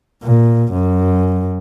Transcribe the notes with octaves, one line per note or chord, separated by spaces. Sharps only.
A#2
F#2